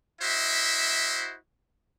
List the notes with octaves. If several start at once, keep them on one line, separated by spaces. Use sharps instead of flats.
E4 F#4 C5 D#5 E5